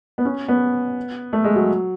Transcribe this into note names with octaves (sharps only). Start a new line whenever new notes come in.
B3
C#4
B3
A3
G#3
F#3